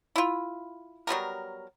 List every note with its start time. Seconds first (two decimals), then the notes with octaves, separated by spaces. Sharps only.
0.16 E4 F4
1.07 F#3 G3 B3 A#4